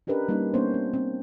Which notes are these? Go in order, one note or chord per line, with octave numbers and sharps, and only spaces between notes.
C#4 D4 G4 A#4 B4 D#5
G3 A#3 C#4 D#4 G4
A#3 B3 C#4 D4 C5 C#5
C4
C4